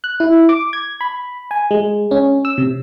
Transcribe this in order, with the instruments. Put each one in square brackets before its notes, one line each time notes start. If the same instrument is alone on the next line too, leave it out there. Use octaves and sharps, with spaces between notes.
[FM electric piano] F#6
E4
D6
G#6
B5
G#5
G#3
C#4
E6
C3